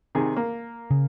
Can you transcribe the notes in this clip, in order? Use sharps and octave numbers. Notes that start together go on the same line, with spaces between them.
C3 D#3 G#4
A#3
C#3